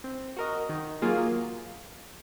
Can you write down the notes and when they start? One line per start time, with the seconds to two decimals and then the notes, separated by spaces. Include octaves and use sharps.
0.04 C4
0.36 F#4 A#4 D#5
0.69 D#3
1.02 F#3 A#3 F4 G#4